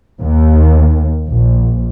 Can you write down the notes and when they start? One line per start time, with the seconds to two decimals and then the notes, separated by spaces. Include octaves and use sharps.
0.21 D#2
1.28 A#1